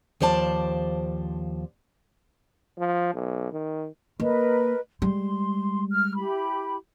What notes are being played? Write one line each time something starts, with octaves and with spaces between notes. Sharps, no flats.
D#2 F3 C5 D5 A5
F3
B1
D#3
A#3 A#4 B4 D#5
G3 G#3 C6
F6
E4 G4 B5